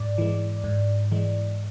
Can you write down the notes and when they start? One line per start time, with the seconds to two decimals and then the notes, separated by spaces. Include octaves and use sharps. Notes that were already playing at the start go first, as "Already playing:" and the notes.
Already playing: G#2 D5
0.18 E3 G#3
0.64 G#2
1.12 E3 G#3